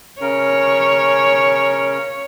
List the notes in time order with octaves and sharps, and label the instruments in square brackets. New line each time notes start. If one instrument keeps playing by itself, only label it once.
[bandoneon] C#3 C#4 A#4 [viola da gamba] C#5